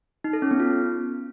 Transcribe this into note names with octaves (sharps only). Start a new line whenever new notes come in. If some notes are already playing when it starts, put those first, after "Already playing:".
D#4
A4
C#4
B3
F4